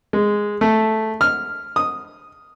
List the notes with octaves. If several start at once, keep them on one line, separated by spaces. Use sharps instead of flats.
G#3
A3
F6
D#6